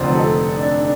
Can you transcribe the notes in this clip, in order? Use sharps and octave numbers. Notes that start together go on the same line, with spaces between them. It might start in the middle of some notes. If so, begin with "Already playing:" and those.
Already playing: F1 F2 D3 C5 D5
A4
D4
D4